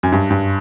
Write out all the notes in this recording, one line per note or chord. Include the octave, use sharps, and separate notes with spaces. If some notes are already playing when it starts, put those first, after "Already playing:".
F#2
G2
G2